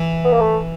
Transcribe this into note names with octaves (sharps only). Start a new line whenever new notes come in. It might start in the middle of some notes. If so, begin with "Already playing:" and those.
Already playing: E3
B3
A#3
A3